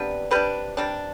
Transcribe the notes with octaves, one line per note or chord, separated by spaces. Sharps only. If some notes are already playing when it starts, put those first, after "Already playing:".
Already playing: C3 G3 B3 D4 B4
C3 G3 D4 B4
C3 G3 D4